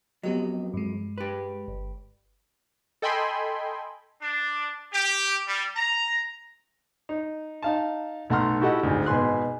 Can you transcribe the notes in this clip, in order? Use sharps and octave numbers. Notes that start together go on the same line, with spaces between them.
F2 F#3 B3 G4 D#5
G2 G#3
G4 B4
G1
A4 D#5 G5 G#5 B5 C6
D4
G4
G3
A#5
D#4
D#4 F5 A5
B1 A3 F#5 A#5 C6 F6
E4 F#4 G4 A4 D#5 F#5
G#1 D2
G#1 B2 B3 G#5 C6 F#6